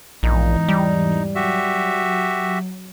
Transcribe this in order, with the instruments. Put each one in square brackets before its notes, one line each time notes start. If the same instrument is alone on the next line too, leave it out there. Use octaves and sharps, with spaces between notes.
[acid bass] A#1 [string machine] E2 G#2 E3 [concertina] D#4
[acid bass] G3
[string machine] F#3 [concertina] F#4 G4 E5